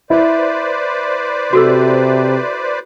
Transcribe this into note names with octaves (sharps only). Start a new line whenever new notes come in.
E4 B4 C5 D5
C3 F#4 A4 E6